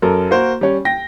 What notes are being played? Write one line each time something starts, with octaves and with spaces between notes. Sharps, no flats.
F#2 A4 A#4
A#3 F#4 A#4 C5
G3 C#4
G5 A#6